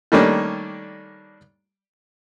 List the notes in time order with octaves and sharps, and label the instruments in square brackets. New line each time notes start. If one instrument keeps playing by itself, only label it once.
[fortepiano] D#3 G3 A3 A#3 C#4 D4